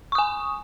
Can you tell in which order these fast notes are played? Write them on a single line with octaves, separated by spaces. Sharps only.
C#6 D#6 G#5